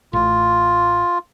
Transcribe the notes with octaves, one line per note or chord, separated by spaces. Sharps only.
A1 A2 F4